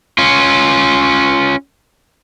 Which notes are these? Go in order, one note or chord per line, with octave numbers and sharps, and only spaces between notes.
C#4 F4